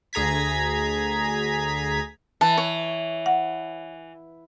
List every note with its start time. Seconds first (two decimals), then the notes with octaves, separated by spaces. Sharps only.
0.13 D2 G#4 A#5 G#6 B6
2.41 E3 A5
2.57 C#5
3.26 F#5